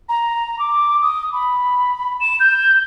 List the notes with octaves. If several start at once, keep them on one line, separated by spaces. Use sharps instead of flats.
A#5
D6
D#6
B5
E7
G6